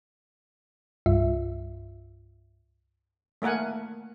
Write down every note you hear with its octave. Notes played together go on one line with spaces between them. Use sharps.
C2 G2 F4 E5
A3 A#3 A#4 F#5 G#5